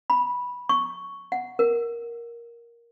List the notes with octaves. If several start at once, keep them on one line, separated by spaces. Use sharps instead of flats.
B5
C#6
F#5
A#4